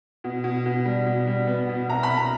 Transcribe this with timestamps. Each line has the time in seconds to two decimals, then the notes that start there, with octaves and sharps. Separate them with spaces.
0.24 B2
0.44 B2
0.66 B2
0.85 G3
1.06 B2
1.27 G3
1.47 B3
1.69 B2
1.90 C2 A#5
2.03 B5
2.09 C2
2.17 A#5